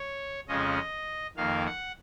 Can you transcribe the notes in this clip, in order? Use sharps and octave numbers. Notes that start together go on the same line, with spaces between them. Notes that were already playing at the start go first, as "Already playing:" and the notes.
Already playing: C#5
F2 C#3 F3 G#3 C#4 D#5
F2 D#3 A#3 F5
F#5